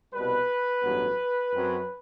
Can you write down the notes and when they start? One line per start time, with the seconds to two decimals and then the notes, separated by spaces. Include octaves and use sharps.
0.13 C2 B2 G3 B4
0.82 A1 G2 F#3 B3
1.52 F#2 F#3 C4